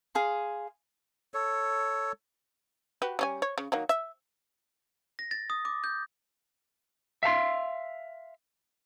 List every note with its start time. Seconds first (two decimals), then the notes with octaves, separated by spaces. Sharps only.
0.15 G#4 F5 C6
1.34 A4 C#5
3.02 F#4 G4 B4
3.19 G3 C#4 G#5
3.42 C#5
3.58 C#3
3.72 D#3 F#3 A#3
3.89 E5
5.19 A#6
5.31 A6
5.50 D#6
5.65 D6
5.84 G6
7.23 E5 F5 A5 C6